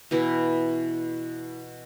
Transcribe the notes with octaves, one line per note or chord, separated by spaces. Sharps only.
B2 E3 E4